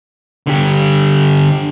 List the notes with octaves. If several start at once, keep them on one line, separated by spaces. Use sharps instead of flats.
D3 G4